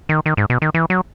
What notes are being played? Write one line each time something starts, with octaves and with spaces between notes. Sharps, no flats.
D#3
D#3
G#2
B2
D#3
E3
F#3